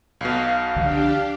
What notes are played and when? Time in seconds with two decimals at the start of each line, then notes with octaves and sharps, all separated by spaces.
0.21 B1 B2 F5
0.76 C2 D3 F3 D4 G4